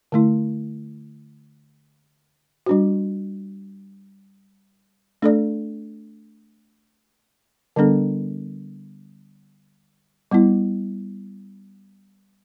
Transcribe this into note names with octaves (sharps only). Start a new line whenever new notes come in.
D3 A3 E4
G3 D4 F#4
A3 D4 A4 D5
D3 G3 B3 D4 A4
G3 B3 E4